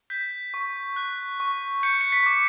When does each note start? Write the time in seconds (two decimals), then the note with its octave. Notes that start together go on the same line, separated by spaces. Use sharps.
0.10 G6 B6
0.54 C#6
0.96 F#6
1.40 C#6
1.83 G6 C#7
2.01 C#7
2.12 B6
2.26 D6